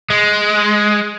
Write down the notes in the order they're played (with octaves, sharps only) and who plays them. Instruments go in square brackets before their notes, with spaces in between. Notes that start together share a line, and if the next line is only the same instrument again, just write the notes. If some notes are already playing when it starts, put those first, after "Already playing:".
[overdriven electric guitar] G#3